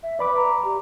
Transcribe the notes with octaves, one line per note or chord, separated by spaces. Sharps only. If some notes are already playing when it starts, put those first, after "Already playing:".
E5
B4 D5 B5 D6
A#5
G4